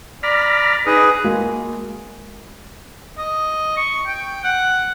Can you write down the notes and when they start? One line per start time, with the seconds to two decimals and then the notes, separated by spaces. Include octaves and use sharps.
0.23 D5 A#5 B5 F6
0.86 D#4 G#4 B4 D#6
1.24 G#3 A#3 F#4
3.18 D#5
3.77 C#6
4.07 G5
4.44 F#5